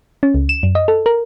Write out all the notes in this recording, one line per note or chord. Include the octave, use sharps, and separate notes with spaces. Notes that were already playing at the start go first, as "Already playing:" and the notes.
C#4
C#2
E7
F#2
D#5
A4
A#4